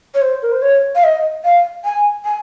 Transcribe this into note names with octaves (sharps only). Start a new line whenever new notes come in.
C#5
C5
A#4
C5
C#5
F5
D#5
F5
G#5
G#5